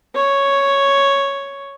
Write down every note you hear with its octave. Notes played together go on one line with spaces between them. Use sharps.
C#5